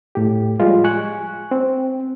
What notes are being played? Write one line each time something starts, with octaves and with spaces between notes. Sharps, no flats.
A2 G4
F3 G3 G#3 F4
G#5 C#6 F#6
C4